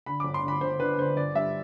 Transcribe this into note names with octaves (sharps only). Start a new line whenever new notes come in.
D3 B5
G1 D6
C6
D3 B5
G1 C5
D3 B4
D3 C5
G1 D5
G2 E5